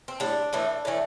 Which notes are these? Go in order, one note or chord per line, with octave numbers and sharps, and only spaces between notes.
C4
A2 G3 D4
A2 E3 A3
A2 E3 A3